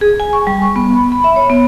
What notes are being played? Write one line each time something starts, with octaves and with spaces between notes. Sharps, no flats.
G#4
G#5
C#6
G3
C#6
B3
B5
B5
E5
C#5
B3